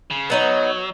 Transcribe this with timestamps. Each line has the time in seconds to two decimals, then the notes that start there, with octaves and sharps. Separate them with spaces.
0.11 C#3
0.30 F#3 B3 D#4 C#5